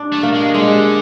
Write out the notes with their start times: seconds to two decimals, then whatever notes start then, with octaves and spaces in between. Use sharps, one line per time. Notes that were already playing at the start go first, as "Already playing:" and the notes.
Already playing: D4
0.12 A3
0.23 A#3
0.34 G#3
0.54 D3 G#3